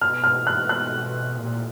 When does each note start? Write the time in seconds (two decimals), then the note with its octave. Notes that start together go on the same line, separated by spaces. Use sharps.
0.01 B2 F6
0.24 F6
0.47 F#6
0.69 F#6
1.38 A#2